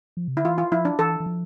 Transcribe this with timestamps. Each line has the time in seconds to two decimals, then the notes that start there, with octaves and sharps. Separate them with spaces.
0.17 F3
0.28 C3
0.36 D3 E4
0.44 E3 F4
0.58 F4
0.72 F3 E4
0.85 D4
0.99 E3 A4
1.20 E3
1.26 F3